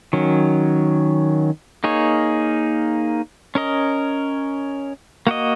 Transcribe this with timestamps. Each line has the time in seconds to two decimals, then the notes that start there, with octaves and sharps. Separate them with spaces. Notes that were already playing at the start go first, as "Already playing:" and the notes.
0.13 D#3 F#3 C#4
1.84 A#3 D#4 G#4 C#5
3.55 C#4 A#4 D#5
5.27 A#3 F#4 D#5